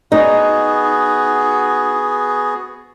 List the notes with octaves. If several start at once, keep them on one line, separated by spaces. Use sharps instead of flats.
B3 D#4 F#4 G#4